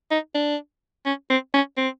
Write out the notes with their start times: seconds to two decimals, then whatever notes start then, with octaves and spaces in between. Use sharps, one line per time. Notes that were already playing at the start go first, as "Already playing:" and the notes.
0.11 D#4
0.35 D4
1.06 C#4
1.30 C4
1.54 C#4
1.77 C4